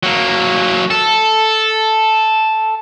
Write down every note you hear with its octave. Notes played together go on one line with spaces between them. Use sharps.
F#3 A#3
A4